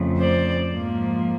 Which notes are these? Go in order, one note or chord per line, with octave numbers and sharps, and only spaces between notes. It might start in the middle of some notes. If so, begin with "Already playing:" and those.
Already playing: F2 C#3 F3 A3
C5 D5
G#2 F3 A#3